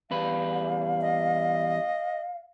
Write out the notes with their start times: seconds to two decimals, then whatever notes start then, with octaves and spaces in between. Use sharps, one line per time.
0.11 E2 G3 B4 F5
1.01 D#5